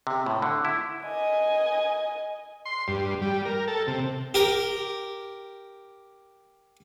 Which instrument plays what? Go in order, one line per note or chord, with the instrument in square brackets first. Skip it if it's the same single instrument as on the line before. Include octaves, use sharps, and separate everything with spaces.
[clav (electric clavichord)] C3
A2
D3
E4
[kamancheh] D#5 G#5
[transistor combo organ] C6
G2
G3
A#4
A4
C3
[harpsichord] G4 A#4